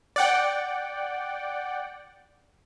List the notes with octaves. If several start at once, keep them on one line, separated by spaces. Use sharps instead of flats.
D5 F#5 G5